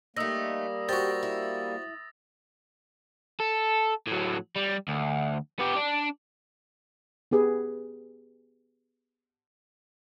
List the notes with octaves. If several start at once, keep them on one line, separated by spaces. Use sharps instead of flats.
G3 A3 A#3 D#4 D#6 E6 A#6
F#4 G4 C5 D#6 A6
E4
A4
A2 F#3
G3
D2
B3 G4
D4
B3 G4 G#4 B4